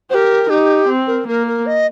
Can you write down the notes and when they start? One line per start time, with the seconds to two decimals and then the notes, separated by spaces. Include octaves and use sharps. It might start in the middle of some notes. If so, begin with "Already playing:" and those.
0.10 G4 A#4 C5
0.50 D#4 G4
0.88 C4
1.07 A#4
1.27 A#3 A#4
1.47 A#4
1.66 D#5